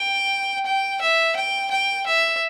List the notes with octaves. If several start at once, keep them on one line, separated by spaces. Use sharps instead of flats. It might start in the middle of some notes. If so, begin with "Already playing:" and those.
Already playing: G5
G5
E5
G5
G5
E5